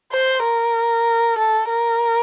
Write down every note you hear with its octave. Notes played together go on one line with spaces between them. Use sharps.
C5
A#4
A4
A#4